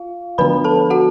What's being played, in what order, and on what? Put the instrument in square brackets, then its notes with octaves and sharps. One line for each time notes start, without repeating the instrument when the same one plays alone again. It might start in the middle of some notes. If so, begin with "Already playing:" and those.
Already playing: [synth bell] F4 F5
D3 F3 B3 D4 B4 B5
A4 A5
F#4 F#5